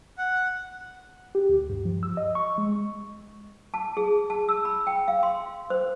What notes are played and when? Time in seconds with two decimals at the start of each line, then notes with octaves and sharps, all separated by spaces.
0.18 F#5
1.35 G4
1.49 D2
1.70 G2
1.85 F3
2.03 E6
2.17 D#5
2.35 C#6
2.58 G#3
3.74 A5
3.97 G#4
4.30 A5
4.49 E6
4.65 B5
4.87 G5
5.08 F5
5.23 C6
5.70 C5